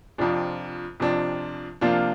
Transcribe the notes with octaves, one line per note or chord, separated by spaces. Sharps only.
F2 C3 F3 D4
F2 C3 F3 D4
C3 F3 A#3 D4 F4